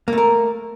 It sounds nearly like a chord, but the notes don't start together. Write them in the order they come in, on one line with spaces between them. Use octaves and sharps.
A#3 A3 A#4